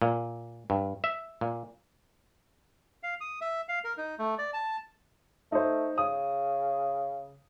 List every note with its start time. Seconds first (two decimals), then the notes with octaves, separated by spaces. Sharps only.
0.02 A#2
0.70 G2
1.04 E5
1.41 A#2
3.03 F5
3.21 D#6
3.41 E5
3.68 F5
3.84 A#4
3.98 D#4
4.19 A3
4.38 D5
4.54 A5
5.52 A3 D#4 C5
5.98 C#3 D#6